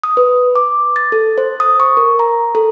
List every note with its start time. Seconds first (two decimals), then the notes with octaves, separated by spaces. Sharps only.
0.03 D#6
0.17 B4
0.55 D6
0.96 A6
1.12 A4
1.38 C5
1.60 D#6
1.80 C#6
1.97 A#4
2.19 A#5
2.55 A4